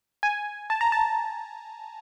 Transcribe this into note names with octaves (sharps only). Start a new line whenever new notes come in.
G#5
A5
A#5
A5